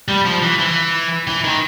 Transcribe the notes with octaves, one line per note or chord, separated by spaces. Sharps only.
G3
F3
E3
E3
E3
D#3